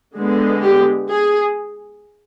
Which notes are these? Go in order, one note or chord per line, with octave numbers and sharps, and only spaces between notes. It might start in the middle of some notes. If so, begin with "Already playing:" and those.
D3 G#3 B3
G4
G#4